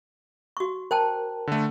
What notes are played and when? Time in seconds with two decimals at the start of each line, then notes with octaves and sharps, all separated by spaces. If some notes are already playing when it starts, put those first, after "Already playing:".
0.57 F#4 C#6
0.91 A#4 C5 G5 A5
1.47 D3 A3